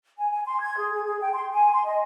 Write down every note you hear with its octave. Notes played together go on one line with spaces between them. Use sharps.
G#5
G#5
C6
G#6
G#4
G#4
G#4
G5
C6
G#5
C6
D#5